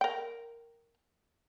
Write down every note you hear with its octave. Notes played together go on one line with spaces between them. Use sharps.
A#4 G5